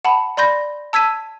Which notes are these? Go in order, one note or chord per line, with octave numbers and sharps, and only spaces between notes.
F#5 A5 B5
D5 B5 C6 G6 A#6
A5 E6 G#6 B6 D#7